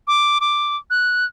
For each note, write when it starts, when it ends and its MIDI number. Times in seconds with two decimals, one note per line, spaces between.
0.07 0.38 86
0.41 0.76 86
0.90 1.25 90